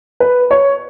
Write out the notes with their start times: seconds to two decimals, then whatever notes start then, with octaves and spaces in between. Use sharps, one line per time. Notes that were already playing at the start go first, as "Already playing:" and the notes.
0.20 B4
0.51 C#5